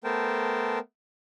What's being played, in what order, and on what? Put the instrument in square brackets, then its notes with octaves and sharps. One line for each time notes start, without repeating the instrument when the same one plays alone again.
[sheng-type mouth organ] A3 B3 A#4 C5 G5 A5